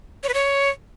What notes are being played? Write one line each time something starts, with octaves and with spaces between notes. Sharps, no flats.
C#5
B4
C#5